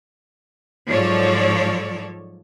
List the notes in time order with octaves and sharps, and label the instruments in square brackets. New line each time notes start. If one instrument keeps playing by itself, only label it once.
[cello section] G#2 F3 F#3 A4 C#5 D5